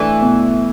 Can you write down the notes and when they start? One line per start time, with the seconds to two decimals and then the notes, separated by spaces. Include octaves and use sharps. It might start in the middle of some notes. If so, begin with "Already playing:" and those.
Already playing: E3 A3 D4
0.21 B2